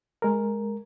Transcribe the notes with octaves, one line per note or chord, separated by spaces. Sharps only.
G#3 A#4